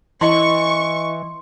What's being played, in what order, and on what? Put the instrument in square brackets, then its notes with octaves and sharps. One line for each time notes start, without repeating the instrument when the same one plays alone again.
[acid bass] E3 [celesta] E4 D#5 [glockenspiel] C6 [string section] C#6